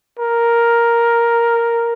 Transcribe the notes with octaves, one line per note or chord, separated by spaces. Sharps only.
A#4